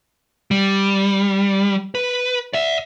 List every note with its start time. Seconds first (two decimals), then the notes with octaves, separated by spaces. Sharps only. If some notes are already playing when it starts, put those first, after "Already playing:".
0.51 G3
1.95 B4
2.53 D5 E5